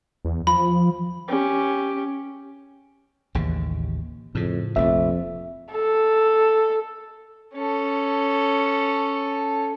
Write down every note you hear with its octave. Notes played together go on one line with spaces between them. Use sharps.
E2
F3 B5
C#4 G4
A1 D#2 C#3
F2 A2 C#3
F1 A#1 F2 A3 E5
A4
C#4 A4